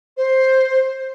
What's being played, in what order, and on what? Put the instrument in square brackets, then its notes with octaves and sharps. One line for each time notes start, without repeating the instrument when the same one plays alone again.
[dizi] C5